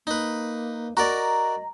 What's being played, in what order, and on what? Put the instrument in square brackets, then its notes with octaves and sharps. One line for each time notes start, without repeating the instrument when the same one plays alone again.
[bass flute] A#3 [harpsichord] D#4 B4
[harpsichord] F#4 A#4 D5 [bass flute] D#5 [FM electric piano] A#5